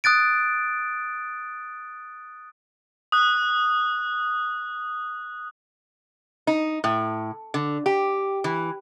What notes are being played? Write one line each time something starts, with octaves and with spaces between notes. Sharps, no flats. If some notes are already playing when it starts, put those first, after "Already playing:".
D#6 F#6 A6 D7
D#6 F#6
D#4
A2
D3
G4
E3